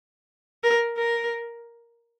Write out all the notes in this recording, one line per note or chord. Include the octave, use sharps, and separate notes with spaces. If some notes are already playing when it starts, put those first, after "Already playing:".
A#4
A#4